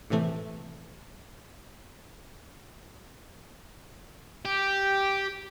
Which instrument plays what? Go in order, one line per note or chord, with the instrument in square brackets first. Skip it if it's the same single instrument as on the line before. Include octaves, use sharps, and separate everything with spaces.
[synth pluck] A2 C3 E3 A3
[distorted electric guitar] G4